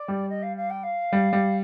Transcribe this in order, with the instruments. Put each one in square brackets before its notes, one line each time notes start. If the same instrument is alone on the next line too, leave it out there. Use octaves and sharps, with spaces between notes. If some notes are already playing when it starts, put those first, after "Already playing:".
Already playing: [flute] D5
[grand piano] G3
[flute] D#5
F5
F5
G5
F5
[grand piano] G3
G3